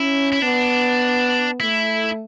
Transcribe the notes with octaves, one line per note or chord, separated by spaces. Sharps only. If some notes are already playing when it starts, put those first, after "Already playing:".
Already playing: C#4 E4
E4
B3 D4
A3 E4